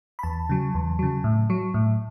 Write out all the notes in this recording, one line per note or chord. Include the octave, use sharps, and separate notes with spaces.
B5
E2 A5
C#3 F#3
E2
C#3 F#3
A2
F#3
A2